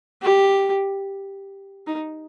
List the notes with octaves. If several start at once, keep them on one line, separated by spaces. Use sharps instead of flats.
G4
D#4